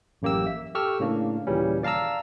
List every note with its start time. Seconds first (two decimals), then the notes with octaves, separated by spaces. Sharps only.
0.22 A1 F#2 A#3 G4 E6
0.47 E5
0.75 G4 A4 C#6 E6 F6
1.00 A2 C#3 A#3 D4
1.47 D#2 A#2 C#3 E3 G3 C#4
1.83 D5 F5 A5 A#5 E6